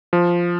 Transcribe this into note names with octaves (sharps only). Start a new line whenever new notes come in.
F3